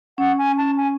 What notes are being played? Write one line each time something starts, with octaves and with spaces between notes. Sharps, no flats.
C#4 F#5
G#5
A5
G#5